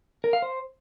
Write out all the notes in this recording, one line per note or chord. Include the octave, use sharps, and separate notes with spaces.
A#4
F5
C5